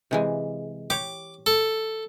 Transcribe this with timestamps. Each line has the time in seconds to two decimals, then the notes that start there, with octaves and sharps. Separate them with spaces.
0.11 C3 E3 G#3
0.90 G4 C#5 D6
1.46 A4